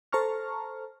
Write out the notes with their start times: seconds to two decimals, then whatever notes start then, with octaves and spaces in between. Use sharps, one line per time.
0.13 A4 C5 A5 A#5 C#6 F6